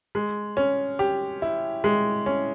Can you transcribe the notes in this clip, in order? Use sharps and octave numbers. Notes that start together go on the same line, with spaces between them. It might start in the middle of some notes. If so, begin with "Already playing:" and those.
G#3
C#4
G4
E4
G#3
C#4